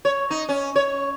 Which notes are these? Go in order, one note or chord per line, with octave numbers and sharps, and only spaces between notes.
C#5
D#4
C#4
C#5